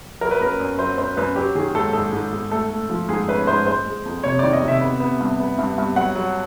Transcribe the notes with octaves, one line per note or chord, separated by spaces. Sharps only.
F#3 A#4
B4
F#2 A#4
F#2
F#3 C5
F#2 C5
F#2 B4
F#3 G4
D#3 G#4
G#2 A4
G#2 A4
G#2
G#2
A3 A4
A3
F3
G#2 G#4
C#4 B4
G#2 C5
G#3 C5
G#3
F2
C3 C#5
D#3 D5
D#5
C3
E5
B3
B3
G2
B3
G2
G2
F#3 F#5
F#3